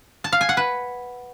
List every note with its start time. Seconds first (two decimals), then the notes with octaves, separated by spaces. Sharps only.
0.24 A5
0.32 F5
0.41 G#5
0.49 F#5
0.57 B4